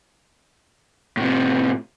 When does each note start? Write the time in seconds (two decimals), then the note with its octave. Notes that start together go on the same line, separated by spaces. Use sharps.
1.17 A2 C3